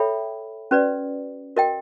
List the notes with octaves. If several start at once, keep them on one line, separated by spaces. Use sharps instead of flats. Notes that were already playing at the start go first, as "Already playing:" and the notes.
Already playing: A4 C#5 E5 G5 B5
C#4 F#4 B4 D5
F#4 A#4 D#5 G5